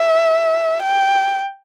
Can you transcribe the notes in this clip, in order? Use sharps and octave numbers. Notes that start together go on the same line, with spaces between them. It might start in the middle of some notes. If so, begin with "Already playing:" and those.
Already playing: E5
G5